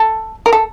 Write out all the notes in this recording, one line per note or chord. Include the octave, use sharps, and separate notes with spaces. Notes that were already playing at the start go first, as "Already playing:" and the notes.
Already playing: A4
A#4
A4